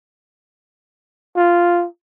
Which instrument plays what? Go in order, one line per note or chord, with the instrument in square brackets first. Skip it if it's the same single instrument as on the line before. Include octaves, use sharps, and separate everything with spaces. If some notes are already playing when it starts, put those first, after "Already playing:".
[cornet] F4